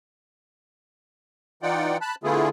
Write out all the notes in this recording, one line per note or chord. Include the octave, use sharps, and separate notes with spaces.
E3 D#4 F4 D5 F#5 G5
A5 B5 F#6
D3 A3 B3 E4 F4 G#4